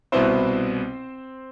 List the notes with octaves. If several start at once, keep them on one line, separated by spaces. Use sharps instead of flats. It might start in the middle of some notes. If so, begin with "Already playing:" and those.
C2 B2 B3 C4 E4 C5